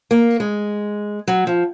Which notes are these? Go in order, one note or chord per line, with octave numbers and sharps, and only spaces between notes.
A#3
G#3
F#3
F3